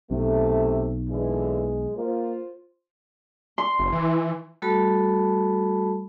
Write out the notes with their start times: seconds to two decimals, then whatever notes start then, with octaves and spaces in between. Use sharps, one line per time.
0.11 B1 C3 A3
1.09 A#2 D3 E3 G#3
1.97 A#3 F4 C5
3.58 C6
3.79 F#1
3.92 E3
4.62 G3 A3 F#4 A4 A5 B5